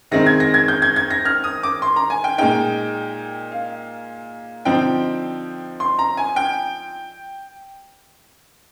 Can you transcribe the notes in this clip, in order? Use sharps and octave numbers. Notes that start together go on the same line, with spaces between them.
D#3 G#3 C4 D#4 A#6
G#6
A#6
G#6
G6
G#6
G#6
A#6
F6
D#6
D6
C6
A#5
G#5
G5
A#2 G#3 D#4 G5
F5
D3 F3 C4 D#4 G5
C6
A#5
G#5
G5